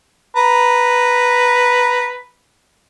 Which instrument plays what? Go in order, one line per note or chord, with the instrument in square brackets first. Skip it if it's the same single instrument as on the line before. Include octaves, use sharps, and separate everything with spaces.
[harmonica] B4 A#5